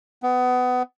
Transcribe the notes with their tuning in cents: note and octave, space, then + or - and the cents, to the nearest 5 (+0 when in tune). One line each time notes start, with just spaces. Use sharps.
B3 +25